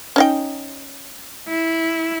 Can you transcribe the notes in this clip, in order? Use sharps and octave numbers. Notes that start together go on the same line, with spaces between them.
C#4 D#4 G5
E4